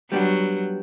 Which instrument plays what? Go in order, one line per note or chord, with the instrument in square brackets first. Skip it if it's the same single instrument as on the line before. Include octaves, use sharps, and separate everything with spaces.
[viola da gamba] F#3 [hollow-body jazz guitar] G3 B3 D4 F#4